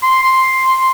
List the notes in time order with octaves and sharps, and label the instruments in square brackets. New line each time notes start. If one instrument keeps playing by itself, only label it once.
[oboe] C6